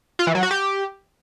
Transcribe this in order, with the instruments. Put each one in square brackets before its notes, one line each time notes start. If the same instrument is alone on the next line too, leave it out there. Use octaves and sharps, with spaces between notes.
[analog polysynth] F4
E3
F#3
F#4
G4